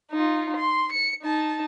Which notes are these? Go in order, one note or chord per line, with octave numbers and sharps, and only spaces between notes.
D#4 F4
C6
C#7
D#4 A5